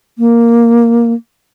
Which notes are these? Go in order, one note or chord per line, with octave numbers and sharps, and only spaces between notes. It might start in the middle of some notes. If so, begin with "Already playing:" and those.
A#3